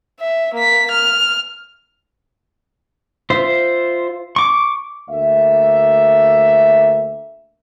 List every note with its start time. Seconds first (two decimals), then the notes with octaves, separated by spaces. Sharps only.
0.20 E5
0.55 A#3 B6
0.91 F6
3.30 F4 C5 E5
4.36 C#6 D6
5.10 D2 A#3 E5